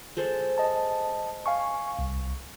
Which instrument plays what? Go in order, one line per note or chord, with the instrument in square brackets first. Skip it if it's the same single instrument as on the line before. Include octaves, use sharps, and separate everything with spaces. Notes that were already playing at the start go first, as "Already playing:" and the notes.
[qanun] G#3 A4 C5
[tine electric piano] D#5 A5
F5 G#5 C#6
C2